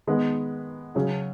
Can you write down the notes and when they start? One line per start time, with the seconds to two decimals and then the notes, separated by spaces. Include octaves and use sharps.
0.07 D#3 G#3 B3
0.95 C#3 F#3 C#4 G#4